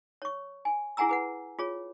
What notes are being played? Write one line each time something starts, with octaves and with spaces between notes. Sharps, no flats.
C#5 C#6
G#5
E4 G#4 F#5 G#5 A#5 E6
G#4 B4 F#5
F4 G#4 C#5